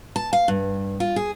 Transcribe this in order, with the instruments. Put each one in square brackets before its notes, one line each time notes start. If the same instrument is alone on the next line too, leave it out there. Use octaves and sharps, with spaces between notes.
[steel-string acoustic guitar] A5
F5
G2
F4
G#4